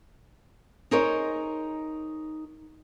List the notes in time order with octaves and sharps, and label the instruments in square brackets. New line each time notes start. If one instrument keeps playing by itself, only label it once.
[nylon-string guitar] D#4 G#4 A#4 C5 C#5 D#5